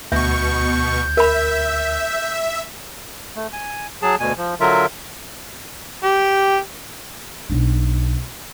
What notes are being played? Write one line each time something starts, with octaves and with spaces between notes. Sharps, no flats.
D2 B2 E5 C#6 G6
A#4 E5 B5
A3
G#5
F#3 G#4 A5
D2 B2 G#5
F3
D3 F#3 F4 A#4 E5
G4
B1 D4